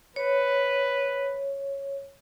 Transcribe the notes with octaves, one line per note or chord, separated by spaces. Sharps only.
B4 C#5